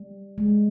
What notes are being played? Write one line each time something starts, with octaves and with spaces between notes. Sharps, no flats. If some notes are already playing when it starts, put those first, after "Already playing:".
Already playing: G3
G#3